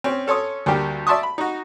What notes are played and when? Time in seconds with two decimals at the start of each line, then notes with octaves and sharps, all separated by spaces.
0.04 C4 C#4
0.26 C#4 A4 C#5 C6 D#6
0.66 D2 G3 A#3 G4
1.07 D5 E5 A5 C6 C#6 D#6
1.23 B5
1.38 D#4 F#4